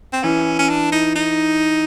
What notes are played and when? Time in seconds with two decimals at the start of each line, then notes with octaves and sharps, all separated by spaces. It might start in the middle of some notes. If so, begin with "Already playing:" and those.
0.13 C4
0.23 E3 C#4
0.59 C#4
0.69 D4
0.92 D#4
1.16 D#4